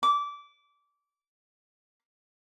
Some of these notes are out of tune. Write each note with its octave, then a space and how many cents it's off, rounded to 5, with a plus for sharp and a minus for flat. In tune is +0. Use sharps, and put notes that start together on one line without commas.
D6 -20